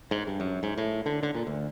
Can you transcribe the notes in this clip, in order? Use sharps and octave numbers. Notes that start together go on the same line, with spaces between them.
G#2
G2
F#2
G#2
A2
D3
D3
A#2
D2